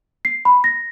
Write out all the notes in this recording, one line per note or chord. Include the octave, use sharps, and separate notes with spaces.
C7
B5
A#6